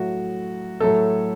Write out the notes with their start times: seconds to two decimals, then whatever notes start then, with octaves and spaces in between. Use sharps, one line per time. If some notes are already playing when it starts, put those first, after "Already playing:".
Already playing: A2 F#3 A3 F#4
0.80 A2 F#3 A3 A4